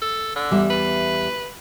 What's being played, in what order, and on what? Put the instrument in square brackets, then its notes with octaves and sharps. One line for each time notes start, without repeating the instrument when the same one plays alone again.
[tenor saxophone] A4
D3
[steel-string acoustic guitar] E2 G3 E5
[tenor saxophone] B4